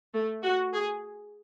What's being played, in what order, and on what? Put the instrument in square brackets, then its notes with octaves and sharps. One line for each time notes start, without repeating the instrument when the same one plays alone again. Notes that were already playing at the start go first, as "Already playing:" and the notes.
[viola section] A3
F#4
G#4